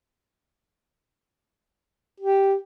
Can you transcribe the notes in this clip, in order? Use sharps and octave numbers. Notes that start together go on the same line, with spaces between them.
G4